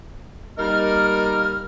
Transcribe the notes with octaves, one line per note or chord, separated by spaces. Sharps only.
G3 A#3 D#4 A#4 F6